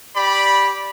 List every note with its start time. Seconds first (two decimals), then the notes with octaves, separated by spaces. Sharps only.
0.16 G4 D5 B5